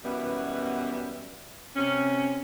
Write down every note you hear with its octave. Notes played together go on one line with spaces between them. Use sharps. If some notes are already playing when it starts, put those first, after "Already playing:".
F#2 B2 E3 G3 B3
C3 C#4